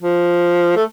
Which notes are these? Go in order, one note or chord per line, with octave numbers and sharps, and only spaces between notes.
F3
A3